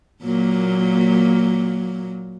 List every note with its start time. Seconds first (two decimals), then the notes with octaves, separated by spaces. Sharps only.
0.23 A#2 F#3 A#3